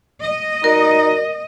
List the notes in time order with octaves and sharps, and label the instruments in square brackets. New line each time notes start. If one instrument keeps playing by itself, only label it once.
[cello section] D#5
[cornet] D#4 [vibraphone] F#4 A#4 D5